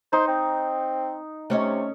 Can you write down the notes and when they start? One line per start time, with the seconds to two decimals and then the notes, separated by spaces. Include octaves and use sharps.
0.13 D#4 C5
0.28 C4
1.50 C3 A3 C#4 D#5